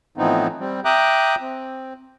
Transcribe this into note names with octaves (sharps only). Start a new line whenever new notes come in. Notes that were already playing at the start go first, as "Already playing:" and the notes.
A2 E3 F3 B3 C4 D#4
G3 C4
E5 G5 A#5 D6 D#6 F#6
C4